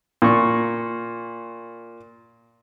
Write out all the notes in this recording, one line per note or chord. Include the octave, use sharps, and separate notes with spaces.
A#2 C#6